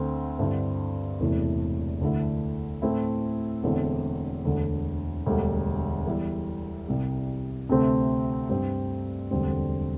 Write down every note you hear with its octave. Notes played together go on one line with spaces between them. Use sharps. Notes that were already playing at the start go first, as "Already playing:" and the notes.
Already playing: D2 D3 C4
G2 D3 C4 E4
E1 E2 C3 E3 A3
D2 D3 A3 E4
A2 A3 C4 E4
E1 E2 D3 C4 E4
E1 D2 D3
E1 D2 D3 G3
E2 E3 G3 E4
C2 C3 G3
D2 C3 A3 C4
G2 G3 C4
E1 D2 D3 G3 C4